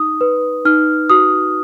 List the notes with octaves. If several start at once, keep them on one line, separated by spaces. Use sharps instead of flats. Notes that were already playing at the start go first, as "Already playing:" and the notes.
Already playing: D#4 D#6
B4
D#4 F6
F#4 D#6